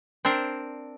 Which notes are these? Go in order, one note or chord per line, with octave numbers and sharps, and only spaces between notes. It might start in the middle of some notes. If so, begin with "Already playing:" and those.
C4 D4 A#4 C5